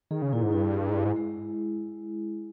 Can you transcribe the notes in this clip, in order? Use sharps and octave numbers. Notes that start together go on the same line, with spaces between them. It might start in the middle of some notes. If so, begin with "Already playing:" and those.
D#3 G#4
C#3
A#2 E4
G#2
G2 E4
G#4
G#2
G2 E4
G#2
G#3